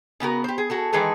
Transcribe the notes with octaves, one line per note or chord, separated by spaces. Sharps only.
C#3 B3 F#4 A#4
G4 C5
G#4
F#4 G#4 A4
D#3 E3 G#3 G#4 A4 B4